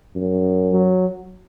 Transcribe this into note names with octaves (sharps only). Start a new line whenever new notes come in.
F#2
F#3